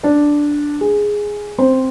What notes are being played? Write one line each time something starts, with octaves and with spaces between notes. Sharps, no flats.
D4 D5
G#4
C4 C5